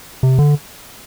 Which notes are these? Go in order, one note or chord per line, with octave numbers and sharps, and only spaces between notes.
C3
D3